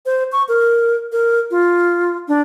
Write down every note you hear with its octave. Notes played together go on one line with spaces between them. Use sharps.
C5
C#6
A#4
A#4
F4
D4